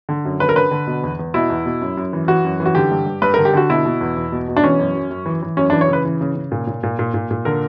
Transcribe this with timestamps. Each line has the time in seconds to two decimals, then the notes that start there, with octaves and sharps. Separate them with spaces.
0.09 D3
0.25 F#2
0.40 D3 B4
0.49 A#4
0.56 D3 B4
0.71 D3
0.87 B2
1.03 E2
1.19 E2
1.34 B2 E4
1.50 E2
1.66 B2
1.81 F#2
1.97 F#2
2.13 E3
2.28 E3 F#4
2.45 F#2
2.60 E3
2.65 F#4
2.75 D3 G4
2.91 G2
3.06 G2
3.22 G2 B4
3.34 D3 A#4
3.45 G4
3.53 D3 F#4
3.70 B2 E4
3.86 B2
4.01 E2
4.17 E2
4.32 B2
4.48 B2
4.57 D4
4.64 E3 C#4
4.79 F#2
4.95 F#2
5.10 F#2
5.26 E3
5.42 E3
5.57 F#2 C#4
5.70 E3 D4
5.81 C#5
5.88 C#3 B4
6.05 E3
6.21 C#3
6.35 C#3
6.52 A#2
6.67 A#2
6.83 A#2
6.99 A#2
7.14 A#2
7.31 A#2
7.45 D3 A#4